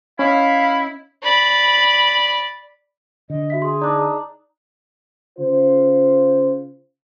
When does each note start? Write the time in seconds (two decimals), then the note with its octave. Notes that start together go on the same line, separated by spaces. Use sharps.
0.19 C#4 E4 D#5 F5 B5
1.23 D5 B5
3.30 D3 D#5
3.50 F#4 E5 B6
3.62 G#4 C6
3.81 D4 D#4 D5
5.39 C#3 F4 C5